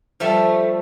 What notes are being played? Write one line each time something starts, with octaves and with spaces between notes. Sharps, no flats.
F3 G3 A3